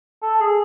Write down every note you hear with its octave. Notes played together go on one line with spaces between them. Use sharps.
A4
G#4